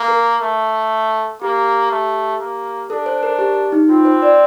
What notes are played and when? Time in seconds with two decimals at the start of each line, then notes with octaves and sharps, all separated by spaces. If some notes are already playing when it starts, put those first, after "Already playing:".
Already playing: A#3
0.08 A#4
0.42 A3
1.41 A#3 G4
1.91 A3
2.40 A#3
2.90 D4 A4
3.06 C5
3.23 A#4
3.39 G4
3.72 D#4
3.89 C4 F4
4.05 C5
4.22 D5